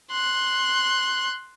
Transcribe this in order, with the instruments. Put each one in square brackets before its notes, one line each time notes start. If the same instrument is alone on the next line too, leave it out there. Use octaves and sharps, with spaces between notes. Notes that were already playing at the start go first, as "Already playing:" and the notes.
[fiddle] C6 F#6